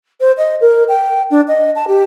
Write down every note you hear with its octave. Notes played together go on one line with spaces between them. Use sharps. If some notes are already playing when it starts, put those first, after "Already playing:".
C5
D#5
A#4
G5
D4
D#5
A5
G4